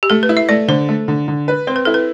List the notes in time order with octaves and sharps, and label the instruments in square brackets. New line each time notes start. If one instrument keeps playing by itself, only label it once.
[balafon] G4
[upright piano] A3 [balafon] A4
[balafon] B4
[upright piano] E4
[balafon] E5
[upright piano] A3 [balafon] D5
[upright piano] D3 [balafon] C5
[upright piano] A3
D3
D3
B4
[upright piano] C4 [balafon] C5
[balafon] B4
[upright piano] E4 [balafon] A4
[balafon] B4